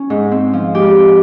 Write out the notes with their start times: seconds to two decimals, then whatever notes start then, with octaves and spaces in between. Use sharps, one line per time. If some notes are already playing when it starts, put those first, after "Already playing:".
Already playing: C#4
0.10 G#2
0.31 C4
0.53 F3
0.74 G#3 G4
0.95 G#2